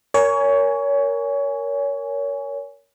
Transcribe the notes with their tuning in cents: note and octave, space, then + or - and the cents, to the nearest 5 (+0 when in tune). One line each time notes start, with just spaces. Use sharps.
A#4 +0 C#5 +25 G#5 +0